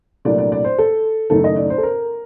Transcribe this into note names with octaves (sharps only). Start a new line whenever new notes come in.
C2 A#2 F#3 A3 D4 D5
D5
D5
C5
A4
F#1 F#2 D#3 A3 A4
D#5
D5
C5
A4
A#4